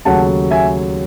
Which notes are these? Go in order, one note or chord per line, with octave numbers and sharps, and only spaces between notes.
D#2 C#3 F#3 A3 F#5 A5
E5 G#5